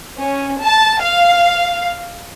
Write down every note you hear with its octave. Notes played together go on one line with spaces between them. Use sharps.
C#4
A5
F5